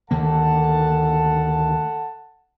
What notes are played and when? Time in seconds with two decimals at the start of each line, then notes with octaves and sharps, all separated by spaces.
0.11 D2 D#3 A#3 A4 F#5 A5